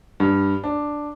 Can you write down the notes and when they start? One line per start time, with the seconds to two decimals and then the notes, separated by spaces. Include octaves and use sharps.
0.20 G2
0.64 D4